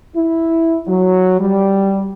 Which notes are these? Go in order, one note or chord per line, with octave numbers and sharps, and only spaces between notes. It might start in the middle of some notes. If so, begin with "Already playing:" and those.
E4
F#3
G3